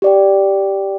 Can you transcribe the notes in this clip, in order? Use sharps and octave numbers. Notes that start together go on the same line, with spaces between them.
G4 D5 G5